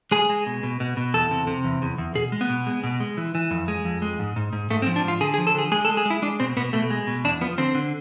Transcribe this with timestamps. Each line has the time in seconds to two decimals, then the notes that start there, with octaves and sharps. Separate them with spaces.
0.11 G#3 G#4
0.29 G#3
0.46 B2
0.63 B2
0.80 B2
0.97 B2
1.14 E2 A4
1.31 C3
1.47 C3
1.65 E2
1.82 E2
1.98 E2
2.15 B2 G#4
2.32 G#3
2.41 B3
2.49 B2
2.67 G#3
2.84 B2
3.00 G#3
3.17 E3
3.35 E3
3.51 F2
3.68 G#3
3.85 F2
4.02 G#3
4.19 G#2
4.36 G#2
4.53 G#2
4.70 G#2 A3
4.82 C4
4.87 F3
4.96 D4
5.04 G#2 F4
5.21 D3 G#4
5.34 G#4
5.38 F3
5.47 A4
5.55 D3 G#4
5.72 G#3 G#4
5.85 A4
5.89 G#3
5.97 G#4
6.06 G#3 E4
6.22 G#3 D4
6.40 B2 C4
6.57 B2 B3
6.73 B2 A3
6.90 G#3
7.07 B2
7.24 E2 D4
7.41 F3 B3
7.58 D3 C4
7.75 D3